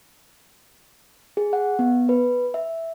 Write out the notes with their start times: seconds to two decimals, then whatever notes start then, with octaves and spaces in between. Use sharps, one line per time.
1.37 G#4
1.53 F#5
1.79 B3
2.09 B4
2.54 E5